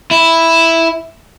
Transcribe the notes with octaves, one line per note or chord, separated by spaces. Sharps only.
E4